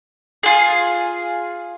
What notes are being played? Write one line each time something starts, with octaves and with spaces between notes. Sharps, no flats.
F4 G#4